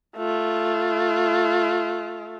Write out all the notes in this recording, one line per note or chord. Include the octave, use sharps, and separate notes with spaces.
A3 F4